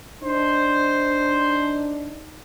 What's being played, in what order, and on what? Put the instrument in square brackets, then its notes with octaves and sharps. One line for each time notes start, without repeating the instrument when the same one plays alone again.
[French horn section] D4 D#4 [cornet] C5